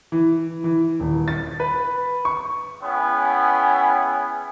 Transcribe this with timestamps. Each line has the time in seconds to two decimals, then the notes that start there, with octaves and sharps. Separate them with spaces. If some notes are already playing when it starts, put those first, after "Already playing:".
0.12 E3
0.64 E3
1.00 D#1
1.28 A6
1.60 B4
2.25 C#6
2.83 B3 C#4 E4 G#4 G5